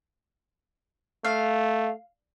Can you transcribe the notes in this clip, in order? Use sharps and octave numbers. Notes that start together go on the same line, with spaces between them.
A3 F5